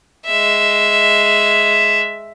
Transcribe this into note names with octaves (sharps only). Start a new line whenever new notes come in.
G#3 E5